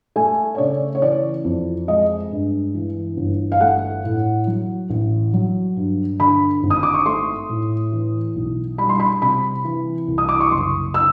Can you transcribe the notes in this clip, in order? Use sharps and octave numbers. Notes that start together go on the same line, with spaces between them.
A3 G#5
C#5
C#3 D5
C#5
E3 D5
F2
G#3 D#5
G2
E3
G1
F5
A3 F#5
A2
F#3
A1
F#3
G2
D3 B5
G#1
D#6
D6
C#6
A3 C6
A2
E3
B1
G3 B5
C6
B5
C3 B5
E3
C2
D#6
D6
C#6
F#1 C6
E6